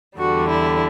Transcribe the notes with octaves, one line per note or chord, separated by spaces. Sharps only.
E2 D3 G3 F#4
E4